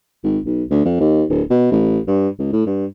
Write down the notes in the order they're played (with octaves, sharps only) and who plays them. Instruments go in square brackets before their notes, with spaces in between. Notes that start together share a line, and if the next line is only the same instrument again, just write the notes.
[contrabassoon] G#1
B1
D2
F2
D#2
D1
B2
A1
G2
C#2
A2
G2